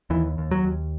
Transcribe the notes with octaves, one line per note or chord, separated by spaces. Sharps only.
D#2 E3
D#2
F#3
D#2